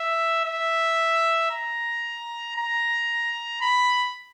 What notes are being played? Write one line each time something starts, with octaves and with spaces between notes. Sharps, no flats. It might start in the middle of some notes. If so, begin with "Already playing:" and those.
Already playing: E5
E5
A#5
A#5
B5